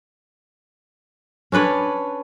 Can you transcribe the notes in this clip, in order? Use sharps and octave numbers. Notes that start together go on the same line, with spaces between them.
C#4 D4 B4 C#5